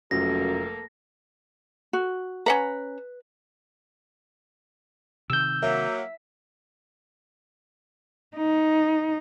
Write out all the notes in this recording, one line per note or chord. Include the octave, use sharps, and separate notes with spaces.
F1 F#2 F3 A#3 A4 A#6
F#4
C#4 B4 F#5 A#5
C3 D#3 E6 G6
F#3 A#3 E5
D#4